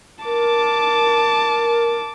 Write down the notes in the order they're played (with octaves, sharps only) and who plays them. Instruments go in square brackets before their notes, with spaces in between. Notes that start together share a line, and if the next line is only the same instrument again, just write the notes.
[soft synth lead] A#4 [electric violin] A5 D6